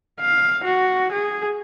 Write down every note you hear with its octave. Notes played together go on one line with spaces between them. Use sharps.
F5
F#4
G#4